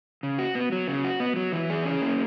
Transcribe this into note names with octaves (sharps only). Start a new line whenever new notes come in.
C#3
F#4
B3
F#3
C#3
F#4
B3
F#3
E3
G#4
C#4
A#3